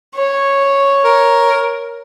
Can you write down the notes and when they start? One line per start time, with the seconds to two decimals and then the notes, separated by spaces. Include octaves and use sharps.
0.15 C#5
1.04 A#4